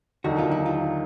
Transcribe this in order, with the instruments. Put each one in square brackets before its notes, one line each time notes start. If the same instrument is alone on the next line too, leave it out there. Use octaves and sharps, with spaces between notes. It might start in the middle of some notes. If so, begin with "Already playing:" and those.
[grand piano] D#2 D3 F#3 A#3 D#4 [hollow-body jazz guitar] F#4
[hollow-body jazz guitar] F4
E4
F4